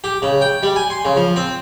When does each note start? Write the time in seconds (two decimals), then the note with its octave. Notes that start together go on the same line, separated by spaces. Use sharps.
0.04 G4
0.22 C#3
0.41 G5
0.63 G3
0.76 G#5
0.90 C6
1.05 C#3
1.16 F3
1.36 C4